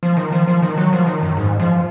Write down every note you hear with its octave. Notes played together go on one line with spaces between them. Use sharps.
F3
D#3
F3
F3
D#3
F#3
F3
D#3
F#2
G#2
F3